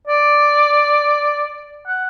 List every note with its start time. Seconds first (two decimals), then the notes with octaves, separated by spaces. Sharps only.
0.07 D5
1.87 F#5